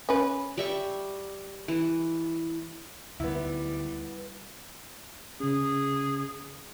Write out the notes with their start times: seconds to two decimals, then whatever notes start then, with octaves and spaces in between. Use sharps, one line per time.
0.09 C#4 B4
0.57 G3 E5 C#6
1.68 E3
3.20 D2 G3 B3 E4
5.40 C#3 C#4 G#4